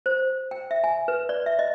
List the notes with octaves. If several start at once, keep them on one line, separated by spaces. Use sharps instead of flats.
C5
G5
E5
G#5
B4
D5
E5
D#5